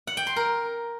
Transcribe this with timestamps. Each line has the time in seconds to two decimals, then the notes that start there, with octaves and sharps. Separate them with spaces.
0.07 F#5
0.17 G5
0.27 C6
0.36 A#4